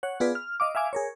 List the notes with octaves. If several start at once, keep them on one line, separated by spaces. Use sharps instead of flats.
C#5 F#5
B3 F4 G#4 B4 D5
F6
D#5 F5 D6
E5 F5 G#5 D6
G#4 A#4 C#5